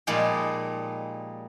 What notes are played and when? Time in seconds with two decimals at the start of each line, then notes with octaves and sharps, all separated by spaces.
0.07 A#2 F3 G3 G#3 D#4 G#4